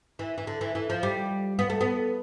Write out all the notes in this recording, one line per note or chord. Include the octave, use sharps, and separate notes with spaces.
E3
E3
D3
E3
E3
F3
G3
B3
A3
B3